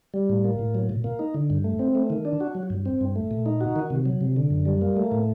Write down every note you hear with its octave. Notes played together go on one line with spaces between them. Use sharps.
G3
A2
A#3
A2
F#3
A#2
A#3
D#4
D3
G2
A3
C4
A3
D#3
D4
F#4
F#3
G2
C4
G2
A3
A#2
D#4
F#4
D#3
C3
F#3
C3
D3
F#2
G3
A#3
A3
A2